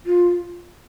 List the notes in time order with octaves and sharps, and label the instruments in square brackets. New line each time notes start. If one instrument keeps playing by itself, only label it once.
[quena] F4